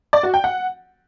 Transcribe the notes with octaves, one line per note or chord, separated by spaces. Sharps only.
D5
F#4
G5
F#5